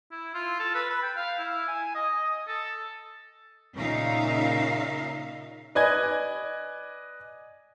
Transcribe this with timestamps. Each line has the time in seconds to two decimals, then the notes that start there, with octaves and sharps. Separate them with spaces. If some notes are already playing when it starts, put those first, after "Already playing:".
0.12 E4
0.34 F4
0.59 A4
0.75 B4
0.90 B5
1.03 G5
1.17 F5
1.38 E4
1.68 G#5
1.95 D#5
2.16 D#5
2.48 A4
3.74 A#2 C#3 D#4 A#4 E5 F5
5.75 B4 D5 D#5 G#5 G#6